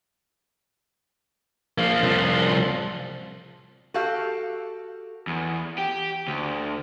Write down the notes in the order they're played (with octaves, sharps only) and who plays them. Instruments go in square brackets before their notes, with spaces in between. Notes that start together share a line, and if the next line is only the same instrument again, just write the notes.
[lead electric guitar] F3 A#3
C2 F3
[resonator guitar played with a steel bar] F#4 G4 A4 F5
[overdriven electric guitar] E2
G4
D2